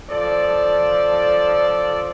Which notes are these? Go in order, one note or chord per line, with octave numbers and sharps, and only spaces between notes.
F3 A4 D5